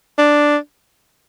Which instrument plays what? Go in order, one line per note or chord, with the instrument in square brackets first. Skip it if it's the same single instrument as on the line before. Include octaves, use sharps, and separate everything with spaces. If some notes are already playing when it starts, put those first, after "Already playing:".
[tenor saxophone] D4